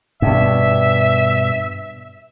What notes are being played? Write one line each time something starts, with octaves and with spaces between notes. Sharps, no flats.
G2 B2 E5